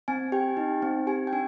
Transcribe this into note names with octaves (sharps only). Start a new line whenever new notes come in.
C4 G#5
G4 G5
D#4
C4
G4 G#5
G5
D4 G#5